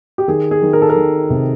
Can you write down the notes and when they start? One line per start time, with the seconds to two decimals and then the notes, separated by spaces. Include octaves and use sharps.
0.18 G4
0.28 D#3 G#4
0.51 G#4
0.62 D#3
0.73 A#4
0.82 A4
0.90 A#4
0.96 D#3
1.30 C3